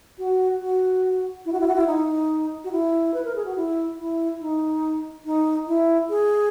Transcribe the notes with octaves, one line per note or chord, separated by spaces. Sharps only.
F#4
F#4
E4
F#4
E4
F#4
E4
D#4
F#4
E4
B4
A#4
G#4
F#4
E4
E4
D#4
D#4
E4
G#4